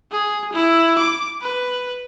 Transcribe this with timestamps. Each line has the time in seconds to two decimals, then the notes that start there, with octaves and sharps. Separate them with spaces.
0.12 G#4
0.53 E4
0.98 D6
1.41 B4